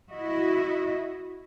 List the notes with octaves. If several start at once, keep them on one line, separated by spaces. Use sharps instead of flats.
E4 F#4 D#5 E5